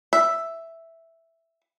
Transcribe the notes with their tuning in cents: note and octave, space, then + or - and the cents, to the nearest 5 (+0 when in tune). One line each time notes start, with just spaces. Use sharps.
E5 +0